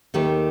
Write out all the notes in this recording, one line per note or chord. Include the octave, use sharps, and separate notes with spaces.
D#2 D#3 A3 G4